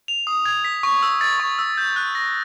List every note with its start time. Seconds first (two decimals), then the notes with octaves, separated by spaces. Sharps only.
0.08 F7
0.27 D#6
0.45 G#6
0.65 B6
0.83 C#6
1.03 E6
1.21 A6
1.40 C#6
1.59 E6
1.77 G6
1.96 F#6
2.15 A#6